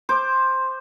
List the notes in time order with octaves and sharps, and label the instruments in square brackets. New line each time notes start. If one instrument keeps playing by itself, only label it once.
[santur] C5 D6